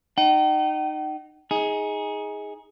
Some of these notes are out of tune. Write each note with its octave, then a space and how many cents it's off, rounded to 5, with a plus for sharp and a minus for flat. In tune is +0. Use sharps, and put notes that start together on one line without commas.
D#4 -20 G5 -45
D#4 +25 G#4 +0